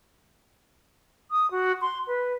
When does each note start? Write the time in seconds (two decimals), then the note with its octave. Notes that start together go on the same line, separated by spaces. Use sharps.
1.31 D#6
1.51 F#4
1.82 C6
2.07 B4